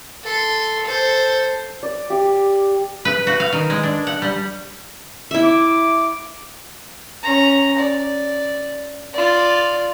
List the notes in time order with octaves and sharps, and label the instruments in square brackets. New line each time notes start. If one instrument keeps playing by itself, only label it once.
[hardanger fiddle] A4 C6
A4 C5
[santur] D5
G4
[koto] B4
F#4
F5
D#3
G#3
D4
F#5
G3
[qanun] E4 E5
[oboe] D6
[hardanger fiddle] C#4 A#5
D5
F4 D5